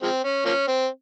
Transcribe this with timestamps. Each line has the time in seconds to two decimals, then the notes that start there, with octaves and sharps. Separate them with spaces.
0.03 F3 G#3 C4
0.24 C#4
0.45 F3 A#3 C#4
0.67 C4